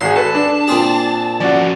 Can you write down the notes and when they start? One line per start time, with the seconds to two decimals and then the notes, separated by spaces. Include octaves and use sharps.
0.01 G#1 F#4 G#4 C6
0.16 A4 B4 A5
0.35 D4
0.68 A#2 C4 G#4
1.40 F3 C#4 F#4 D5